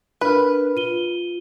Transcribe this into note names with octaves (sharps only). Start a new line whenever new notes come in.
D4 A#4 B4 F6
F4 D#7 G7